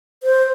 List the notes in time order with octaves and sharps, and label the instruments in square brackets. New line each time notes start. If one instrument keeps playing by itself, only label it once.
[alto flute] C5